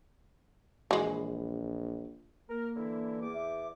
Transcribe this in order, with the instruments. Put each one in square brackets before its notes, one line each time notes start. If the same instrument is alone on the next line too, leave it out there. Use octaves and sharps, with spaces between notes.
[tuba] A#1 [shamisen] E3 G#3
[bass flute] A#3 [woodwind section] A#4
[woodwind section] D3 E3 E4
E2 D6
[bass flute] E5